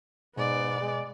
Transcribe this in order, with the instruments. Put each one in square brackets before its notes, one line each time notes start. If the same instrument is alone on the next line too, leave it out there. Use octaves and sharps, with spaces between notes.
[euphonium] G#2 [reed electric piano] B2 [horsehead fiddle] B3 D5
[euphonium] G#3